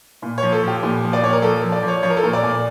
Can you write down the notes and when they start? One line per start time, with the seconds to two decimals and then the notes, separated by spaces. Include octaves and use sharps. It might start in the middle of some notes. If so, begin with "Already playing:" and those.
0.22 A#2
0.38 F3 C#5
0.52 A4
0.63 F3 G4
0.83 A#2
1.03 F3
1.13 D5
1.22 A#2 C#5
1.33 A#4
1.42 F3 A4
1.63 F3
1.72 D5
1.82 F3
1.88 C#5
2.03 F3 C#5
2.10 A#4
2.17 A4
2.23 A#2 A#4
2.33 D5
2.43 A#2